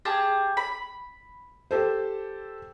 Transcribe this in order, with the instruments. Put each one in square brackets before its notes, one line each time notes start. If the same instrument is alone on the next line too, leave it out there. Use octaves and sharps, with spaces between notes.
[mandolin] G4 G#4 A5
B5
[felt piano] G4 A4 C5